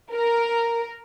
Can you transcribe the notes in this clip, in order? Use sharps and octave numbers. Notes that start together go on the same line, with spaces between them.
A#4